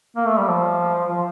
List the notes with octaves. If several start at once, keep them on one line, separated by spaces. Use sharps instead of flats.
A#3
A3
G3
F3
F3